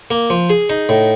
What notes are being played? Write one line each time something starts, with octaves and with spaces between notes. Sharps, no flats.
A#3
F3
G#4
D#4
A2